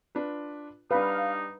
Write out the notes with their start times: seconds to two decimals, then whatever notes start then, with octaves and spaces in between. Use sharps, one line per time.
0.15 D4 F4 B4
0.91 G3 D4 D#4 B4 F5